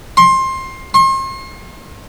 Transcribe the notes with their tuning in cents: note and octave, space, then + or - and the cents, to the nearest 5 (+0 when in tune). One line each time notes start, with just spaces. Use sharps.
C6 +20
C6 +40